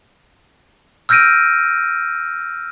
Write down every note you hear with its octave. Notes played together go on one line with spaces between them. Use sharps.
E6 F6 G6 A#6 D7 D#7